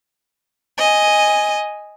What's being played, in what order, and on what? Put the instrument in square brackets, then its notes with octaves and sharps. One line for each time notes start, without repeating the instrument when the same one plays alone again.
[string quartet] D#5 G#5